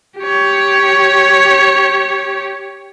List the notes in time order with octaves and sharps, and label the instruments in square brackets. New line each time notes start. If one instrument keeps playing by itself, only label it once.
[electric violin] G4 C#5